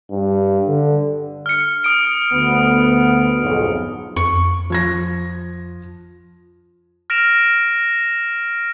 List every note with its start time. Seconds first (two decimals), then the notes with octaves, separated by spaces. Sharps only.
0.11 G2
0.67 D3
1.46 F6 C#7
1.84 D#6 D7
2.33 D2 B3
3.42 B1 F2 G#2
4.16 F2 C#6
4.70 F3 G#6 A#6
7.10 F6 A#6 D7 E7 F7